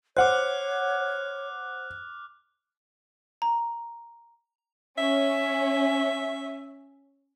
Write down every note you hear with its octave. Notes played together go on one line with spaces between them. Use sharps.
C5 C#5 F#5 D6 F6 F#6
A#5
C#4 E5